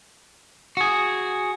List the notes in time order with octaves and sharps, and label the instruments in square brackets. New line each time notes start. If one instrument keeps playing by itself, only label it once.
[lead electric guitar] F#4 G#4